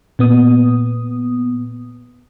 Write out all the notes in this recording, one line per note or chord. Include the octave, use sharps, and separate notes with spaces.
A#2 B3 D#6